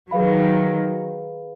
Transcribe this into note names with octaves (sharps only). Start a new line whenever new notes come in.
D#3 F#3 G#4 B4 F5 B5